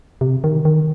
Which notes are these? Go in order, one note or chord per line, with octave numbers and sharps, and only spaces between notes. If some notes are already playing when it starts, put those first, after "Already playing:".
C3
D#3
D#3